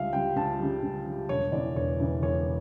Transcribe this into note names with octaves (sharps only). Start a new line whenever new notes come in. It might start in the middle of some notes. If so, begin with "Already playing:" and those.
Already playing: C#2 C#3 G3 E5 F5
C#3 G3 G5
C#2 A5
C#3 G3
C#2
C#3 G3
E1 C#5
E2 C#3 E3 D5
E1 C#5
E2 C#3 E3
E1 C#5